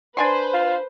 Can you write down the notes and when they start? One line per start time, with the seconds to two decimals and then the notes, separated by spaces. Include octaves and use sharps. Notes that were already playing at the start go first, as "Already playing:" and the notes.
0.17 D4 B4 C5 G#5 C6
0.53 F4